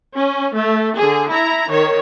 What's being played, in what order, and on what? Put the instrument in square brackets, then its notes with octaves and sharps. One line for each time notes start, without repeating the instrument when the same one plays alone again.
[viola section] C#4
A3
D3 G#4
E4 A#5
D#3 C#5